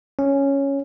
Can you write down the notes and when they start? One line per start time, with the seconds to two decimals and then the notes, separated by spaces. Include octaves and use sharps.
0.19 C#4